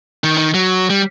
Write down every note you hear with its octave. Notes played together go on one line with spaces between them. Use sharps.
D#3
D#3
F#3
G3